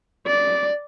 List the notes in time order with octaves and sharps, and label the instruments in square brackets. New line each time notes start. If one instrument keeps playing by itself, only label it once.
[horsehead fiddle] D5